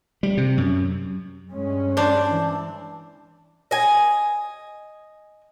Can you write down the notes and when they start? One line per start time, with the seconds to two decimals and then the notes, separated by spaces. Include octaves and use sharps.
0.23 G3
0.37 C3
0.58 F#2
1.51 G2 G#3 C#4
1.97 D4 C5
2.27 E3
3.71 D#5 G#5